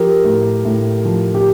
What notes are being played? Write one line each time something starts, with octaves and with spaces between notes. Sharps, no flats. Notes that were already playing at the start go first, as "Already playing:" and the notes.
Already playing: F3 G4 A#4
A2
A2
F3
G4